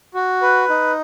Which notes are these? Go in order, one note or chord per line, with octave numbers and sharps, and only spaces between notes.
F#4
B4
D#4